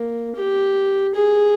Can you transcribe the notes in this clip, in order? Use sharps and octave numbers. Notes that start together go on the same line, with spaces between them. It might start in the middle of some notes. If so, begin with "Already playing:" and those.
Already playing: A#3
G4
G#4